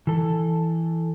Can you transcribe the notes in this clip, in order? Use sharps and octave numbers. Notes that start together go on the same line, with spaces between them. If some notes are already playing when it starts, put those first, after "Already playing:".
E3 A4